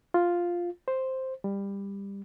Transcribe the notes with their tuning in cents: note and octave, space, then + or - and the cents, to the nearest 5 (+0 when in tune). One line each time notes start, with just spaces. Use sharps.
F4 +0
C5 +0
G3 +20